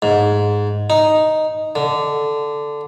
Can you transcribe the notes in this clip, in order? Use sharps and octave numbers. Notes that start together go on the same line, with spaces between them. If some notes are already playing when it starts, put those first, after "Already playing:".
G#2
D#4
D3